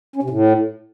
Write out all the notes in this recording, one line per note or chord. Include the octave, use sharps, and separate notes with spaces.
C#4
C3
A2